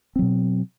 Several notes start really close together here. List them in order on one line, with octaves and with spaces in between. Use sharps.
C4 F#3 B2